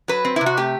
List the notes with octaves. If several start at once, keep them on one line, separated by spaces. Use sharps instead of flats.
F#3 B4
C4
C3 E4
F#4
A3 G4